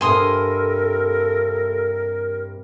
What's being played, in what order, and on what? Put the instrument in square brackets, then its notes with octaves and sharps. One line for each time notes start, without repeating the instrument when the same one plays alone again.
[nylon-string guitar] G2 C3 [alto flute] A4 [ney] A#4 [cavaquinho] G#5 C6 D#6